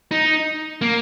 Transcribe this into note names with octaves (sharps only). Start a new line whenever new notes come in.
D#4
A#3